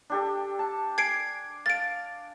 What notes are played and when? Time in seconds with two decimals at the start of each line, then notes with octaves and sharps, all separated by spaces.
0.10 D4 G4 A4
0.59 A5
0.98 G#5 G#6 C7 D7
1.66 F5 A6 D7